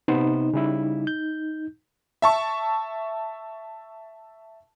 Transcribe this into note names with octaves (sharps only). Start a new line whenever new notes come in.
C3 B3 D#4 C5
C#3 G3 E4
G6
E5 A5 C#6